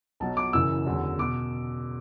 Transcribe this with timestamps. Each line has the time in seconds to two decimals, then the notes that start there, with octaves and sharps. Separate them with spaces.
0.20 B1 B2 F#3 A5
0.37 D6
0.53 F#1 F#2 E3 E6
0.86 E2 D3 F#3
1.19 B2 D6